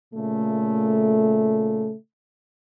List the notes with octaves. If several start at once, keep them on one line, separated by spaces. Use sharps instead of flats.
A#2 C#3 A3